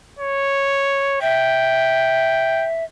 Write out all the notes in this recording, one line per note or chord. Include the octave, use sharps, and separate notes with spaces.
C#5
E5 G5